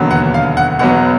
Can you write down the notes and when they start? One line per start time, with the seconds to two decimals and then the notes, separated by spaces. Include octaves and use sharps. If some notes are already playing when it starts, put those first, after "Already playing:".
Already playing: E1 D#2 D3 F#3 B3
0.11 F#5
0.34 F5
0.57 F#5
0.79 E1 E2 B2 F#3 B3 F#5